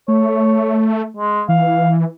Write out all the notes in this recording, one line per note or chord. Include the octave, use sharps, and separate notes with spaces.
A3 C#5
G#3
E3 F5